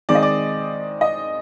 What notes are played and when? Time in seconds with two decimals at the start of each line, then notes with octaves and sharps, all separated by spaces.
0.09 D#3 G#3 C4 D5
0.15 D#5
0.23 D5
1.01 D#5